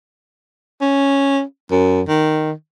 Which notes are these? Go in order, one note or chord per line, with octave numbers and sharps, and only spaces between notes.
C#4
F#2
D#3